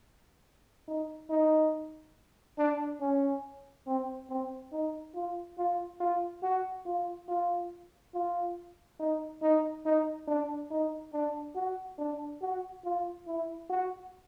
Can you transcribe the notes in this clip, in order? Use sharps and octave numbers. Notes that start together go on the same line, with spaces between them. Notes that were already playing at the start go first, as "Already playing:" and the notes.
D#4
D#4
D4
C#4
C4
C4
D#4
F4
F4
F4
F#4
F4
F4
F4
D#4
D#4
D#4
D4
D#4
D4
F#4
D4
F#4
F4
E4
F#4